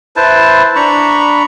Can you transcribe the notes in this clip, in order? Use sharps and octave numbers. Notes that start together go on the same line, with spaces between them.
E4 B4 C5 A5
D4 A#5 B5 C#6